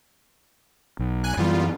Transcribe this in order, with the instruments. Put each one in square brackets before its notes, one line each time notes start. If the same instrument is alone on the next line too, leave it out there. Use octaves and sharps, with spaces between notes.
[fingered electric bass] B1
[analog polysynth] G#5 F#6
[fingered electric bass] F#2 E3 [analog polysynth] G3 B3 F4